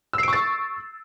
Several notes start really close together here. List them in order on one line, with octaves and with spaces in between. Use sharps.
E6 C7 D7 C#6 A6